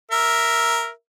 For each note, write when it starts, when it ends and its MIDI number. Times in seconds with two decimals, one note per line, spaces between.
0.11 0.90 70
0.11 0.90 76